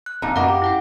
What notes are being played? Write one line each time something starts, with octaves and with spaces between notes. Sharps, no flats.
F#6
D1 F2 A#2 D#4
F#2 B2 A#3 D#5 F5 F#5
G4
E4 F#5 G5